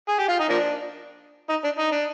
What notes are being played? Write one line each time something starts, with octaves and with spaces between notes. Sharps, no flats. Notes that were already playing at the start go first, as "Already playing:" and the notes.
G#4
G4
F4
D#4
F3 A#3 D4
D#4
D4
D#4
D4